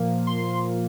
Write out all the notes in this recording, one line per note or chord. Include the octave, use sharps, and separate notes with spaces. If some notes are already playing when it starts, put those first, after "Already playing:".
Already playing: A#2 F3 A#3
C6